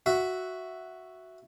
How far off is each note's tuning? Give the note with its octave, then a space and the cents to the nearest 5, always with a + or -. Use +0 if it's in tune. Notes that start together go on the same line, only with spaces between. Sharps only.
F#4 +0 E5 +0